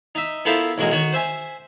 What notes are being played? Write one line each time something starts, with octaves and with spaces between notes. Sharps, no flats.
D#4 E5
B3 E4 F4 A4 A#4 C5
B1 E2 G#3 F#4 A#4
D#3 F#4 C#5
C5 E5 G#5